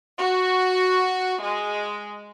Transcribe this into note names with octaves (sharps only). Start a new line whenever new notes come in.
F#4
G#3